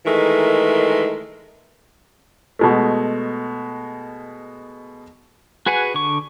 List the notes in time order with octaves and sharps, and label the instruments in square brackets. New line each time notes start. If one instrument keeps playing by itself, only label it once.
[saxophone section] D#3 E3 G#3 A3 A#4
[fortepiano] B2 G#3 A3
[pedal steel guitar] F#4 G#4 B4 F#5 G#5
D3 C#6